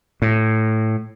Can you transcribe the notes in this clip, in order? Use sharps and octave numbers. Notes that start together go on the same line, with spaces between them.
A2